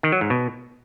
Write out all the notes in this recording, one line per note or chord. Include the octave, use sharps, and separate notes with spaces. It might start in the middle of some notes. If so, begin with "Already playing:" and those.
D#3
F#3
G#2
B2